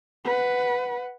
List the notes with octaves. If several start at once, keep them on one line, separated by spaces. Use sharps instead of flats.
B4 F#5